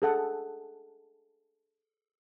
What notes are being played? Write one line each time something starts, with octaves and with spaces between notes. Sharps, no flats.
G#4 A4 F#5